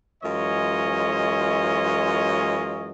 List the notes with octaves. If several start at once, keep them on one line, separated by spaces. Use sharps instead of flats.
F#2 E3 G#3 F4 C#5 D#5